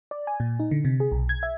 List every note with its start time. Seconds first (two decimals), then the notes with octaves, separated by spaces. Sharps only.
0.11 D5
0.27 G#5
0.40 A#2
0.60 D#4
0.71 D3
0.85 C3
1.00 G#4
1.12 B1
1.29 G#6
1.43 E5